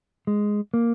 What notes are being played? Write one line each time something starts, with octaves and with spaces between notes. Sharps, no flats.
G#3
A#3